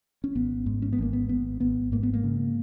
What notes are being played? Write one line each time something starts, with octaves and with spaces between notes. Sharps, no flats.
C#4
G#1 B3
G#2
C#4
B3
G#1 A#3
B3
G#1 B3
G#1 B3
G#2 A#3
B3
A#3
C#3